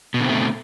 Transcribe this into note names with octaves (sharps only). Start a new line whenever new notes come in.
B2 D3 A3 C4